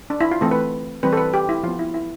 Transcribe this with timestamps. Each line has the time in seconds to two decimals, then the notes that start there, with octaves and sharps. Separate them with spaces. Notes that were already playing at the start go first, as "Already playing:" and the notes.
0.10 D4
0.21 E4
0.31 F4
0.41 E3 A3 C4 A4
0.51 B4
1.03 E3 G3 C4 B4
1.13 A4
1.17 B4
1.34 G4
1.49 E4
1.63 F3 B3 F4
1.79 E4
1.94 E4